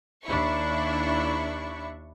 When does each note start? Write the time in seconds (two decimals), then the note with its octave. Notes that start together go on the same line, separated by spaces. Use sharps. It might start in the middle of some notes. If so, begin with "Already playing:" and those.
0.25 D#2 D4 E4 C#6